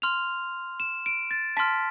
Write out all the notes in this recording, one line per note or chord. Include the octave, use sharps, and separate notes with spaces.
C6 F6 F7
E7
D7
A6
A5 C6 F6 B6